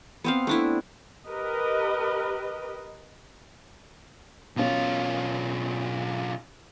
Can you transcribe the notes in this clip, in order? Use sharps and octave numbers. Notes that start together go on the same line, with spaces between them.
B3 C4 F5
A3 D4 E4
G4 A#4 B4 D#5
B1 B2 C#4 F4